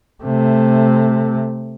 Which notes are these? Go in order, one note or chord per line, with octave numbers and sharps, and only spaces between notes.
C3 A3